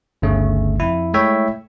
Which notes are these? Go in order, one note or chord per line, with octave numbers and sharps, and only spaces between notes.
G1 D2 C#3 A3
F2 E4
G#3 A3 E4 C#5 E5 G5